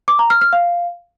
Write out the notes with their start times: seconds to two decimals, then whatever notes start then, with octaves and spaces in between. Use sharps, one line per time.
0.08 D6
0.19 A#5
0.30 F6
0.41 F6
0.53 F5